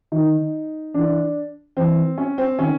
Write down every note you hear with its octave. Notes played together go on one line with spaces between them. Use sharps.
D#3 D#4
E3 D4
E3 C4
C#4
C4
D#3 C#4